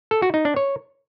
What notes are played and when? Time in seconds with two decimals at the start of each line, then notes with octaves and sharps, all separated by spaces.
0.11 A4
0.22 F#4
0.34 D#4
0.45 D4
0.56 C#5